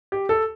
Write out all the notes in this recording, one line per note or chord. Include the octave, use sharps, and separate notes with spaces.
G4
A4